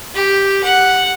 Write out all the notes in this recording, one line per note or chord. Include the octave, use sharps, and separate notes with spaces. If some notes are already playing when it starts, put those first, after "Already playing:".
G4
F#5